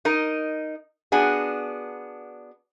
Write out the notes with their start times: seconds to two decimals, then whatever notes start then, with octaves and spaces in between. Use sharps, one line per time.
0.05 D#4 A#4 D#5
1.12 B3 D4 F#4 G#4